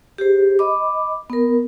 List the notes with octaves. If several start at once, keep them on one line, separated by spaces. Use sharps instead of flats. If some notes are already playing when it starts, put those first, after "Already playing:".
G4 G#4 C5
D#5 B5 D6
B3 A#4